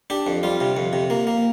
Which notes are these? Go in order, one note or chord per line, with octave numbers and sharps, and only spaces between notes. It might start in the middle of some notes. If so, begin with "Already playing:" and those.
D4 G4
F2
G3 F4
C3
F2
C3
A#3
A#3